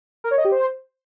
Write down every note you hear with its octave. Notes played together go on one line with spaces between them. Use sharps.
A#4
C#5
D#5
G4
C5